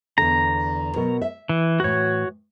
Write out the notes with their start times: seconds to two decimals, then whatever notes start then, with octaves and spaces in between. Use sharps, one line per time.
0.18 E2 D3 A#5
0.96 B2 F#3 A#4
1.22 E5
1.49 E3
1.80 A2 E3 F#4 C#5